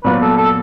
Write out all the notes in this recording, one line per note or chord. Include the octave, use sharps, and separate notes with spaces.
A#2 F#3 B3 B4
A4
A4